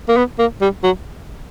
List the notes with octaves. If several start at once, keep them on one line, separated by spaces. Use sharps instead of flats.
A#3
B3
A#3
G3
F#3